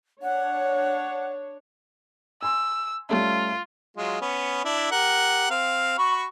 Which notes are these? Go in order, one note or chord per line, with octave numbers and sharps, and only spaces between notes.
D4 C#5 F#5
G#5 C6 E6
G3 A3 C#4 F4
F#3 G#3 F4
B3 C#4
D4 E4
G4 A#4 F#5
C4 F5
F#4 B5 C#6